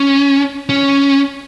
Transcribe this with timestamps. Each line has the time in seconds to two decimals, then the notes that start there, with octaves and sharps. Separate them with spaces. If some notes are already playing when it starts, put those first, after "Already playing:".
Already playing: C#4
0.69 C#4